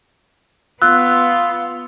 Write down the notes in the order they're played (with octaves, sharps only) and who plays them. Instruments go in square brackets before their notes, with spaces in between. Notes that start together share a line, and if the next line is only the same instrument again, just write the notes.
[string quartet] B3 [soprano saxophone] F4 [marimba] C6 F#6 [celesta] E6